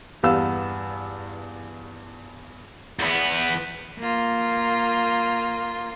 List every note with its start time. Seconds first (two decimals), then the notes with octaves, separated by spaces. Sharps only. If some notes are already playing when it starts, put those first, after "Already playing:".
0.23 E2 G2 B3 F5 E6
2.99 E2 B3
3.99 A#3 F4